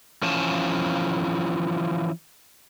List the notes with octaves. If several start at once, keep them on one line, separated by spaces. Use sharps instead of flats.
E3 F3 C#4 F4 G#5 A5